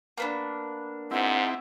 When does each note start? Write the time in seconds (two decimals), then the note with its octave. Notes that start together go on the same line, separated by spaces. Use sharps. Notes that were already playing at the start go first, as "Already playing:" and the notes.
0.17 A#3 B3 D4
1.11 G#2 C4 E4 F#5